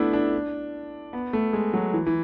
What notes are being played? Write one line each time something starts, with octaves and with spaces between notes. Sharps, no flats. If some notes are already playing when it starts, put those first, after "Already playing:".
Already playing: A3 B3 D4 E4
D4
B3
A3
G#3
F#3
E3
E3